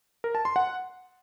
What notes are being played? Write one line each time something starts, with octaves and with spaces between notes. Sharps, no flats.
A#4
A5
C6
F#5